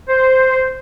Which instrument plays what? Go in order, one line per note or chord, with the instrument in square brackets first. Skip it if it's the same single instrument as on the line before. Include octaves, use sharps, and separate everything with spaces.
[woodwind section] C5